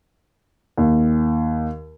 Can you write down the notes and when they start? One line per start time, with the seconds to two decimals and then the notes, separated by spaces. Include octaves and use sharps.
0.78 D#2